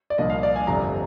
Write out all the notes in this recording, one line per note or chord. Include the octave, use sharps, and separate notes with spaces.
D5
C2 A#2 F3 A#3 D4 D#5
F5
D5
G#5
G1 F2 C3 A#5